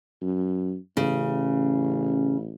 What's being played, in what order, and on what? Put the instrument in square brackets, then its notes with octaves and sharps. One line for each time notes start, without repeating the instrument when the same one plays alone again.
[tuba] F#2
[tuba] A1 [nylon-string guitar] C#3